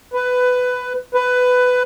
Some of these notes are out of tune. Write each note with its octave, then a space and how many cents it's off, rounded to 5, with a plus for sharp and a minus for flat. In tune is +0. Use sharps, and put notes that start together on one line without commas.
B4 +15
B4 +15